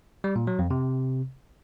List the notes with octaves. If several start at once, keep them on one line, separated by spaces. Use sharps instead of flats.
G3
A#2
F#3
F2
C3